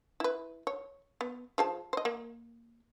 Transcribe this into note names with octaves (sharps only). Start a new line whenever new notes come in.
E4 B4
C#5
B3
F3 G#4 A5
C5 D#5
A#3